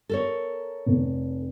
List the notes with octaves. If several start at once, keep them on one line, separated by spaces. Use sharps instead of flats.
A4 A#4 C#5
F1